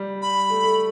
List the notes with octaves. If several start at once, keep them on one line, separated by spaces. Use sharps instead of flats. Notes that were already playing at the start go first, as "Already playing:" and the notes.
Already playing: G3
B5
A3
A3